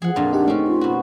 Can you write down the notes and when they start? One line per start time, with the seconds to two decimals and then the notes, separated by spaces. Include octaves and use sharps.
0.02 F3 G#4 F#5
0.16 F2 A#2 D4 F4
0.33 D#4 G4 F#5
0.48 A3 C4 C#4 D#4
0.67 F4
0.81 B2 F#4